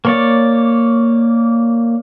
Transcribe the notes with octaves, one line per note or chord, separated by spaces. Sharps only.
A#3 C#5 D5